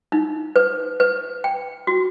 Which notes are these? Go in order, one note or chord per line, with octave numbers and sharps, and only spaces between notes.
D#4
B4
B4
G5
F#4